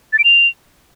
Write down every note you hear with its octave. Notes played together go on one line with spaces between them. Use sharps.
A6
D7
F7